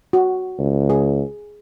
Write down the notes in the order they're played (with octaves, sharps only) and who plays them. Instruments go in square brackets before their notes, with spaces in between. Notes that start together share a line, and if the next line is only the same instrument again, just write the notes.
[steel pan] F#4
[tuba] C#2
[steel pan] G#4